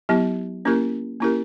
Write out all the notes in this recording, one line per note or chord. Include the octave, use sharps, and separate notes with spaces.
F#3 B3 E4 G4
A#3 C#4 E4 G4 A#4
A#3 C#4 E4 G4 A#4